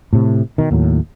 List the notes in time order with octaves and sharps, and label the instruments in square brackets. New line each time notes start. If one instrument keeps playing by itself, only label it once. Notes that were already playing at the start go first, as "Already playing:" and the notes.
[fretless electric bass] A2 C3
B2 D#3
D#2 A2 F#3